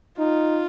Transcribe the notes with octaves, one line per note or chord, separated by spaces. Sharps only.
D#4 F4